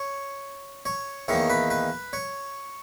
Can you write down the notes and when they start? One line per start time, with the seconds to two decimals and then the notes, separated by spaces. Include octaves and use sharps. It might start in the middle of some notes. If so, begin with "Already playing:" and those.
Already playing: C#5
0.85 C#5
1.28 E2 D#3 A#3 C#5
1.50 B4
1.70 B4
2.13 C#5